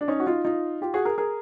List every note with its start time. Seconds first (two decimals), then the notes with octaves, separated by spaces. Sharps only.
0.01 D4
0.08 C#4 D#4
0.20 F#4
0.27 D#4 F4
0.45 D#4 F4
0.82 F4 G4
0.94 F#4 G#4
1.05 G#4 A#4
1.18 G#4 A#4